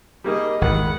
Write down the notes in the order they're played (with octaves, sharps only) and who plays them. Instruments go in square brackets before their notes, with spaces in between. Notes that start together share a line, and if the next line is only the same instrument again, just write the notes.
[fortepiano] G3 A#3 D#4 [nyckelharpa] G#4 D#5
[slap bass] G#1 E2 [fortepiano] D#3 [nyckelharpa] B4 F#5